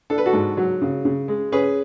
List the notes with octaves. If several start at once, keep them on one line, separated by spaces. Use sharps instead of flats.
D4 A4
B4
F#4 A4
G#2
F#3
C#3
C#3
G#3
C#4 G#4 B4